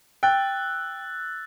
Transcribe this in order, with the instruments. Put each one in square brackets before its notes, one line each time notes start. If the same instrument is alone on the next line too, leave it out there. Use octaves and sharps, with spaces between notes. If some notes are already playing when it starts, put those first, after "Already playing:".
[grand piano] G5 [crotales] E6 F#6 A6